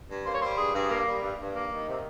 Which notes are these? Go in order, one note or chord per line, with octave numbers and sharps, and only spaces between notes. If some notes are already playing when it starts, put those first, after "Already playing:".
G2
A#3 C5
C#5
G3 C5
G2 G#4
G2 G#4
A#3
G3
G2
G2
A#3
D#3
C3